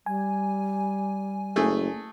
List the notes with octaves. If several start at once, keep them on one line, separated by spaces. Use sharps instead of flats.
G3 G#5
F#1 A3 G#4